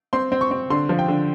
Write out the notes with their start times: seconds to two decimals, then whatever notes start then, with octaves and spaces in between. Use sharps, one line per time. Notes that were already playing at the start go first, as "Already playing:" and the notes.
0.13 C4 C6
0.32 C4
0.41 C#6
0.51 C4
0.70 D3 C6
0.89 F3
0.99 G5
1.08 D3